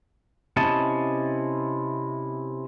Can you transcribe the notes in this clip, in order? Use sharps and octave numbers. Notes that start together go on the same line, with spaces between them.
C3 C#4 E4 D#5 A5